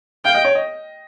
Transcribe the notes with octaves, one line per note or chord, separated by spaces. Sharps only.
F5 G5
D#5
C#5
D#5